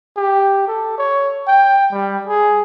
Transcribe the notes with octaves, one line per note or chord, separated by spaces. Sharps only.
G4
A4
C#5
G5
G3
G#4